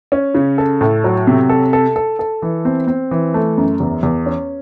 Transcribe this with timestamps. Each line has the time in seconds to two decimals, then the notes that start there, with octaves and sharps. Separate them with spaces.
0.12 C#4
0.35 C#3
0.58 A4
0.81 A2
1.04 F#3
1.27 C3
1.49 A4
1.73 A4
1.96 A4
2.19 A4
2.42 E3
2.65 C4
2.87 C4
3.11 E3
3.34 A3
3.58 F#2
3.80 E2
4.03 E2
4.26 C#4